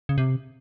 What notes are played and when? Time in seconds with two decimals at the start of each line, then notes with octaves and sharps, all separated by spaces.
0.09 C#3
0.18 C3